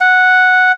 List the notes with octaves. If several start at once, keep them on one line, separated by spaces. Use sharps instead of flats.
F#5